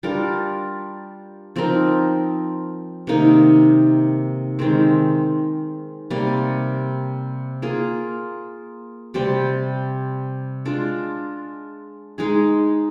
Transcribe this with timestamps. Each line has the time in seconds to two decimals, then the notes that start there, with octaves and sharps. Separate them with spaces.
0.03 G3 D4 F4 A#4
1.56 F3 C4 D#4 A#4
3.07 C3 D#3 A#3 D#4
4.59 D#3 G#3 C4
6.10 C3 G3 A#3
7.62 A#3 F4 G#4
9.14 C3 G3 C4 G4
10.65 G#3 D4 F4
12.18 G#3 D#4 G#4